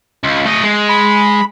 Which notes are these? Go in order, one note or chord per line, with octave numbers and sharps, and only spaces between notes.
C#2
A3 D#5
G#3
B5